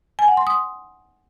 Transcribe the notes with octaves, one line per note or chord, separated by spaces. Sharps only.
G#5
F#5
C6
D#6